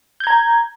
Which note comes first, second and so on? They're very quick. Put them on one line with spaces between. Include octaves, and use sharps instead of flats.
G6 G#6 A#5